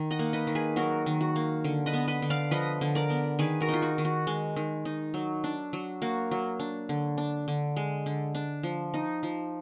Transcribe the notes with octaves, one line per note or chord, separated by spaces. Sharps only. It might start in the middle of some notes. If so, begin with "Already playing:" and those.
Already playing: D#3
D#5 F#5
A#3
B4 D#5
D#3
G#4 B4
F#3 F#4 A#4
D#3
F#4
A#3
D3
B4 D#5
B3
B4 D#5
D3
D5 F5
F3 B4 D#5
D3
A#4 D5
B3
D#3 G#4 B4
F#4 A#4
D#4 F4
F#4
D#3
F#4
G#3
D#3
D#4
F#3
D4
F#3
A#3 F#4
F#3
D4
D3
D4
D3
G#3
D3
D4
F3
D#4
F3